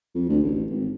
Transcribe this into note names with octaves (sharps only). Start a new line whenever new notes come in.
F2
D2
A1
G#1